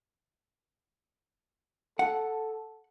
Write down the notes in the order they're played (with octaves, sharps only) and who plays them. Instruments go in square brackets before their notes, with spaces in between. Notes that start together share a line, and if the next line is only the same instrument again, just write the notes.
[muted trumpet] A4 [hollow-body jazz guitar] F#5